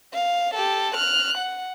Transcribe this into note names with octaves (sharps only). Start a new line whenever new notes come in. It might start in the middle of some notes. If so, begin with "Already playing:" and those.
F5
G4 A4
F6 F#6
F#5